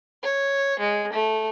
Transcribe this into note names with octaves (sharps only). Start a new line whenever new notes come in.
C#5
G#3
A3